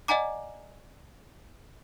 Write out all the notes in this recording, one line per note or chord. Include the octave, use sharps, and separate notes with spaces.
D5 D#5 F#5 G#5 A#5 D6